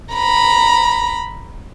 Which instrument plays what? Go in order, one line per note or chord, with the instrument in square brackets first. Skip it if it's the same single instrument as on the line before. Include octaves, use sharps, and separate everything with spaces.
[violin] A#5 B5